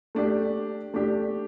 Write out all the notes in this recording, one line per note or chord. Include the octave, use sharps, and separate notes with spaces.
A3 D4 G4
A3 D4 G4